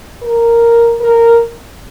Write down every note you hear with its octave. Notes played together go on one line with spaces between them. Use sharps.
A#4
A#4